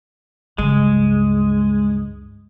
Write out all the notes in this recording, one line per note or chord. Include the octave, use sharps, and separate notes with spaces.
C#2 G2 G#3